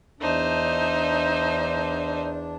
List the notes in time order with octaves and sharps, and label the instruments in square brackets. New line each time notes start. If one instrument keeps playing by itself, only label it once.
[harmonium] E2 D4 [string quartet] D#4 C5 E5